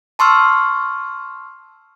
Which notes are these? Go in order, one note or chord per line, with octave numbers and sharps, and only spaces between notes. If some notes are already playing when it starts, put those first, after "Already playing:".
A5 C6 C#6 E6 F6